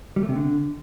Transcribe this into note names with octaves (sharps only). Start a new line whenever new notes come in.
G3
A3
C3
D3